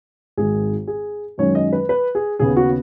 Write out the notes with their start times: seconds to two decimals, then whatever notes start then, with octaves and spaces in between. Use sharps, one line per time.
0.37 G#1 G#2 D#3 G#4
0.87 G#4
1.38 F#2 D#3 G#3 C#4 C#5
1.55 D#5
1.73 B4
1.89 B4
2.15 G#4
2.39 D#2 C#3 B3 G#4
2.57 F#4